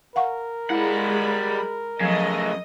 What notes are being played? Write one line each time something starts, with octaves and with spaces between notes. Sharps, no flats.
A#4 F5 F#5 C#6
G3 G#3 E4 F#5 B5
C#3 F3 F#3 A3 D#5